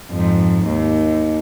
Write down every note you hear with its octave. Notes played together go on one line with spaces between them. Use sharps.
F2 G#2
D#2